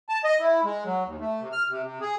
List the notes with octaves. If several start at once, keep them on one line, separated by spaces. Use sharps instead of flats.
A5
D#5
E4
G#3
F#3
D#2
A3
C3
F6
C3
C3
G#4